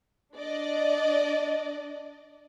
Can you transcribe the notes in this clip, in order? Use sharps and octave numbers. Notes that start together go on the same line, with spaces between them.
D4 D5 D#5